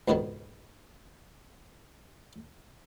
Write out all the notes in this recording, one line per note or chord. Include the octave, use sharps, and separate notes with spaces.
C#2 G#2 B2 D3 D#3